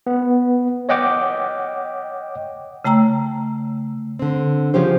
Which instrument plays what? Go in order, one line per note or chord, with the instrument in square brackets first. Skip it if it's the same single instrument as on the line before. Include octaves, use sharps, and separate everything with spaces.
[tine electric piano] B3
C#5 D#5 F#5 G5 D6
[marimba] C#3 A3 G5 A#5 E6
[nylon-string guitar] D3 C4
C#3 F3 C#4 G4 C5